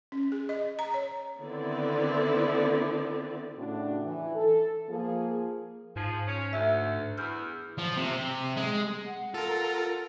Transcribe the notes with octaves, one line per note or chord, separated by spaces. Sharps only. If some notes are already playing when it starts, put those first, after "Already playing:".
C#4
G#4
D#5
A#5
C#5
D3 D#3 B3 C4 E4 D5
A2 C#3 D4 F#4
E3
A4
F3 A#3 G#4
G#2 F3 G#4
C#4
D2 E5 E6
E2 F6 G6
F3
C3
G#3
F#5
F4 A4 A#4